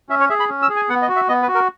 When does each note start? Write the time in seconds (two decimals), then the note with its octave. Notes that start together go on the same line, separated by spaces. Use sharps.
0.09 C#4 E5
0.20 C#5
0.29 G#4 E5
0.40 B5
0.49 C#4
0.62 E6
0.69 G#4
0.76 G#5
0.89 B3 F#5
1.02 D#5
1.08 F#4
1.16 E5
1.28 B3 D#5
1.42 B4
1.48 F#4
1.55 A#4